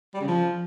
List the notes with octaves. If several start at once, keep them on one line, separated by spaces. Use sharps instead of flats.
G3
C#3
F3